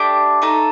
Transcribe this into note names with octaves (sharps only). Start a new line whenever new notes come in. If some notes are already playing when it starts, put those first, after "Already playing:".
Already playing: A3 D4 G4 D6
A3 D#4 A4